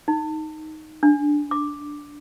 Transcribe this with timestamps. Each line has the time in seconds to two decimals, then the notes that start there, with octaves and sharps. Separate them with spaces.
0.08 D#4
1.03 D4
1.51 D6